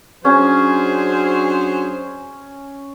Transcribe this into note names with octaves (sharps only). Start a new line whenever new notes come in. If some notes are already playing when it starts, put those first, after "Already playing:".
F#3 C#4 D4 G#4 C5